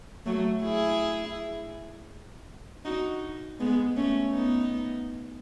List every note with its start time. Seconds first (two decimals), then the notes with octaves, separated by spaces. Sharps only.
0.26 F#3 A3
0.63 E4 G#4
2.85 D#4 F#4
3.60 G#3 B3
3.96 A3 C#4
4.33 B3 D#4